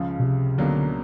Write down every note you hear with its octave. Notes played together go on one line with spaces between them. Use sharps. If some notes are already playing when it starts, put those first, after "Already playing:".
Already playing: C#2 C#3 F3
B2
C3
C#2 B2 D3 F#3 A#3 D4